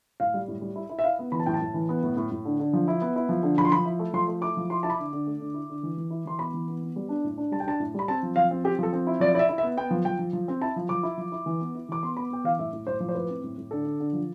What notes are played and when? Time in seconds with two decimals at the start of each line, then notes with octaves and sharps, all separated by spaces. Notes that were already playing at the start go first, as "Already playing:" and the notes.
0.20 A2 F5
0.34 G3
0.48 A2
0.61 G3
0.76 E4
0.90 E4
0.99 E5
1.04 E4 F5
1.19 B3
1.32 E3 B5
1.40 A5
1.46 A2 G5
1.54 A5
1.61 A2
1.74 E3
1.89 B3
2.03 A2
2.17 A2
2.31 A2
2.45 D3
2.60 D3
2.73 F3
2.88 E4
3.02 B3
3.16 E4
3.29 F3
3.43 D3
3.58 F3 B5
3.65 C6
3.72 F3 B5
3.85 E4
3.99 A3
4.13 F3 C6
4.28 A3
4.42 E4 D6
4.57 F3
4.70 E4 C6
4.83 E4 A5
4.90 B5
4.98 D3
5.13 D3
5.27 A3
5.40 D3
5.54 E4
5.69 D3
5.83 E3
5.97 E3
6.10 E4
6.25 E3 C6
6.39 B3 B5
6.53 E3
6.68 B3
6.82 B3
6.96 G3
7.09 D4
7.24 A2
7.38 D4
7.51 G3 A5
7.60 G5
7.65 D4 A5
7.80 A2
7.94 G3 B5
8.08 C4 A5
8.23 F3
8.36 F3 F5
8.51 C4
8.64 C4 G4
8.79 F3 A4
8.93 C4
9.07 E4
9.20 F3 D5
9.34 E4 D5
9.39 E5
9.49 E4
9.58 E5
9.63 B3
9.77 B3 G5
9.91 F3
10.05 F3 G5
10.19 F3
10.33 F3
10.48 C4
10.61 E4 A5
10.76 F3
10.89 F3 D6
11.03 E4
11.18 F3
11.32 E4
11.46 E3
11.60 B3
11.75 E4
11.89 E3 D6
12.02 B3 C6
12.17 B3 B5
12.30 B3 G5
12.44 E3 F5
12.59 A2 E5
12.73 A2
12.87 A2 C5
13.00 F3
13.09 C5
13.15 A2 B4
13.29 C4
13.44 A2
13.57 A2
13.71 D3 A4
13.85 D3
14.00 D3
14.13 F3